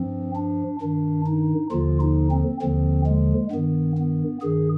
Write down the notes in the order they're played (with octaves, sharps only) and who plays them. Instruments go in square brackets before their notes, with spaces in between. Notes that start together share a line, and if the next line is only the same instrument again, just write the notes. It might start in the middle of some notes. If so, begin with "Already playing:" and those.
Already playing: [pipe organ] G2 F3 C4
D4
G2 D#3 D4
D#4
D#2 D3 F3 F4
D#4
C4
D#2 D3 F3 C4
G#3
G2 D#3 B3
B3
G2 D#3 G#4